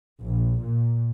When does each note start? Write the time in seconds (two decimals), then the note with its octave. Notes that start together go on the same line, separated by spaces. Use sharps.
0.23 A#1
0.64 A#2